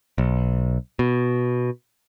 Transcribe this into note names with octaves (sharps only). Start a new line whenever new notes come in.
B1
B2